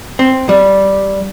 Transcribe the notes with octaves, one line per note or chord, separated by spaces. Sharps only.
C4
G3